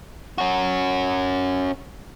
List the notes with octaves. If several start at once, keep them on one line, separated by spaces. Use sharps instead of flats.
C#4 F#4